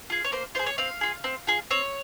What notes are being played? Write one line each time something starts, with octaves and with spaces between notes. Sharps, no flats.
F4 G#4
C#5
A#3 C5
F4 G#4 C5
C#5
C4 F5
F4 G#4
C4
F4 G#4
C4 C#5